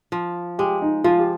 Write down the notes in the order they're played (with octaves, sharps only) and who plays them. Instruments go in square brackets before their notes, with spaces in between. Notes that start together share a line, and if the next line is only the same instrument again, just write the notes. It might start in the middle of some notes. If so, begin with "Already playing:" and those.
[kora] F3
[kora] G#3 [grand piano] G4
[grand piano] D#4
[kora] F3 [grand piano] F4
[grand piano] G4